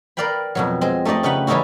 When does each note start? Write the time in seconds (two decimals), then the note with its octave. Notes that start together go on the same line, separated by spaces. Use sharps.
0.17 A#4 B4 D5 F5 G5 B5
0.55 F2 B2 F#3
0.81 G#3 C4
1.05 A3 D#4 G4 D5 D#5
1.23 C#3 D#4 G4 B4 F#5 B5
1.47 E3 G3 C#4 D#4 E4 F#4